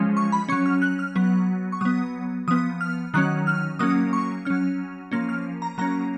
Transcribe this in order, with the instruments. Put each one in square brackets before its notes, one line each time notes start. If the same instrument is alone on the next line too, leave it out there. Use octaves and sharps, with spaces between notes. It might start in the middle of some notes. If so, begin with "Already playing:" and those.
Already playing: [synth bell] F3 G#3 C#4
C#6
B5
F#3 C#4 C#6
F6
F#6
F6
F#3 B3 F#6
C#6
F#3 B3 D#6
F3 B3 D#6
F6
D#3 F#3 C#4 F#6
F6
F#3 A#3 C#4 D#6
C#6
F#3 C#4 F6
F3 A#3 C#4 F6
F6
A#5
F#3 A#3 C#4 A#5